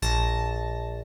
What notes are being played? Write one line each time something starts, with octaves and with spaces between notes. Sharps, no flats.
A#1 A5 A#6